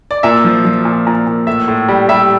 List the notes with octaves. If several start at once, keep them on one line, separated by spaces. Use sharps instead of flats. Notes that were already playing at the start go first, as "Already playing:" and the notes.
D5
A#2 E5
F3
F3
A#2
A#2
A#2
A2 E5
A2
G3
G3 E5